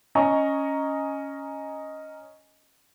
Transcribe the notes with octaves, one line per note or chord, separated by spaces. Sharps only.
C#4 D#5 G#5 A#5 C#6